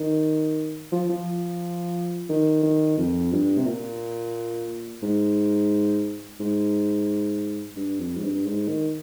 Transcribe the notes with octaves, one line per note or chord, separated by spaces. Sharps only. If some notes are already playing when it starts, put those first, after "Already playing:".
Already playing: D#3
F3
F3
D#3
D#3
F2
G2
C3
A#2
G#2
G#2
G2
F2
G#2
G2
G#2
D#3